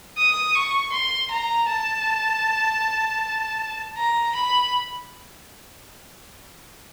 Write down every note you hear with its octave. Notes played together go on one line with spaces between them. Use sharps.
D#6
C#6
C6
A#5
A5
A#5
B5